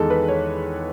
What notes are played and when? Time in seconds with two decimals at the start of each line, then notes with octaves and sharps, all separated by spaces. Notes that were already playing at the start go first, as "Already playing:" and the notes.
Already playing: E2 D#3 G#3 D#4 A4
0.10 B4
0.28 C#5